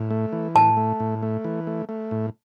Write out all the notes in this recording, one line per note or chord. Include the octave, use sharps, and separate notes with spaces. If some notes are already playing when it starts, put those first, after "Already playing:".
Already playing: A2
A3
E3
A2 A5
A3
A2
A3
E3
A3
A3
A2